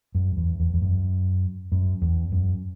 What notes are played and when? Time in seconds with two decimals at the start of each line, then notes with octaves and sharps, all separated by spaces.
0.15 F#2
0.37 E2
0.60 E2
0.74 E2
0.82 F#2
1.72 F#2
2.02 E2
2.32 F#2